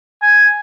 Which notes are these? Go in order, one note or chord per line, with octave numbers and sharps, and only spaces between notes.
G#5